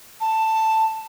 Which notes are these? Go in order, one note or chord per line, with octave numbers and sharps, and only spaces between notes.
A5